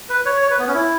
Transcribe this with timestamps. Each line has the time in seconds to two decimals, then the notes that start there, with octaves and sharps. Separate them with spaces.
0.09 B4
0.26 C#5
0.42 C#5
0.51 B4
0.59 B3
0.67 C#4
0.74 E4